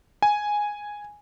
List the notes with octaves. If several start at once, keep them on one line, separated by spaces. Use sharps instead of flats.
G#5